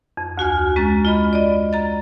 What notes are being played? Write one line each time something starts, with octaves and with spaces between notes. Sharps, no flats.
F2
D2 F#4 G#5 F6
G#3 C#4 A#5 A6
F4 D#5 B5
D5 D#5
A#5 A6